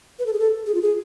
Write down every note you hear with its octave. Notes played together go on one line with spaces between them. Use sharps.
B4
A4
G#4
A4
G#4
F4
G#4